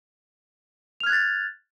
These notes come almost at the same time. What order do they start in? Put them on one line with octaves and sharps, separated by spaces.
F7 F6 G#6 F#6 A6